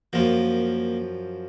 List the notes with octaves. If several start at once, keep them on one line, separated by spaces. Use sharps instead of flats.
F#2 F3 A#3